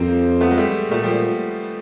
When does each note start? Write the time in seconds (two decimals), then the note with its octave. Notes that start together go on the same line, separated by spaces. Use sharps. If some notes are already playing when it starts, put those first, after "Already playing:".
Already playing: F2 F3 G3 A#3 C4
0.41 A3 B3
0.51 G#3
0.57 G3 A3
0.91 A#2 G3 A3
1.03 F3 G3